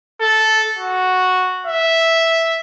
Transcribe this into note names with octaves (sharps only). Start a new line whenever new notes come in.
A4
F#4
E5